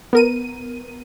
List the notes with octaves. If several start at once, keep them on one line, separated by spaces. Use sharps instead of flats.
B3 A#4 D#7